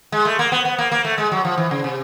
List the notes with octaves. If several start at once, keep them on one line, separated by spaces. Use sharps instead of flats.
G#3
A3
A#3
B3
B3
A#3
A#3
A3
G#3
F#3
F3
E3
C#3
C3